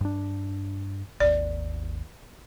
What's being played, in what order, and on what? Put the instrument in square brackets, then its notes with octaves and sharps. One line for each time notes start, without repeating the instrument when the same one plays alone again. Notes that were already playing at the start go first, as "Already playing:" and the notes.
[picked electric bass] G2 D4
[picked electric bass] G#1 D#2 [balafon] D5